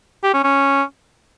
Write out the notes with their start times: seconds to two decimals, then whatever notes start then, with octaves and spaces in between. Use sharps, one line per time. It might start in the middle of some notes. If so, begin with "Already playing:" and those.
0.23 G4
0.33 C#4
0.44 C#4